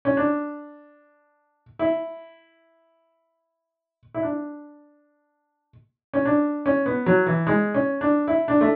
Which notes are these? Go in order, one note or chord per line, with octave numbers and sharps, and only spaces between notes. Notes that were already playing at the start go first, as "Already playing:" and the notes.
C#4
D4
E4
E4
D4
C#4
D4
C#4
B3
F#3
E3
G#3
C#4
D4
E4
D4
A3